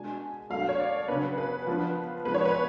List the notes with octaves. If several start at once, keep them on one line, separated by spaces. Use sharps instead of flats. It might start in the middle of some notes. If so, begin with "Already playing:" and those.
Already playing: B2 G#3 D4 G#5
B2 F#3 A3 D4 F5
C#5
D5
C#3 F#3 B3 D4 B4
B4
F3 B3 D4
F3 G#3 B3 B4
C#5
B4